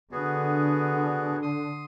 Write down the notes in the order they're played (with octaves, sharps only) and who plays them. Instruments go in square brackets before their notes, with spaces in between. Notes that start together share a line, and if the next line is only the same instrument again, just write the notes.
[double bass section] D3 [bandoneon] B3 F#4 G#4
[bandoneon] C6 D#6